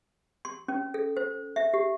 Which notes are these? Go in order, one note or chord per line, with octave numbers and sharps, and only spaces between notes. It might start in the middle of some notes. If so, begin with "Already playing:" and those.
C6
C#4
A4
C5
E5
G4